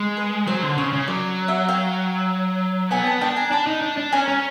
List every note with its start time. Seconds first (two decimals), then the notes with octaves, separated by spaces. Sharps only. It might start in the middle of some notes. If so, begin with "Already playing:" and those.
Already playing: G#3
0.17 B4
0.47 F#3 C5
0.62 D3
0.77 C#3 C#5
0.93 C#3
1.08 F#3 D5
1.48 E5 F#5
1.68 F5 G5
2.91 B3 F#5 G#5
3.06 G5 A5
3.21 D4 G5 A5
3.36 G#5 A#5
3.51 D4 A5 B5
3.67 D#4
3.82 D4
3.97 D4
4.12 C#4 G#5 A#5
4.28 C#4